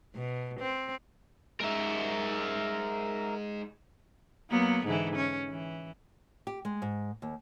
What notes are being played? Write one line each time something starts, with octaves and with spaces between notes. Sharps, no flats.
B2
C4
G#3 D#4 A#4 E5
F#3 A#3 B3
G#2 D3 E3
C#4
E3
G4
G#3
G#2
D#2